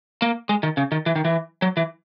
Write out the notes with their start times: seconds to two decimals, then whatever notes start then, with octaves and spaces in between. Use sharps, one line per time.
0.22 A#3
0.49 G#3
0.63 D#3
0.77 C#3
0.92 D#3
1.06 E3
1.16 D#3
1.25 E3
1.62 F#3
1.77 E3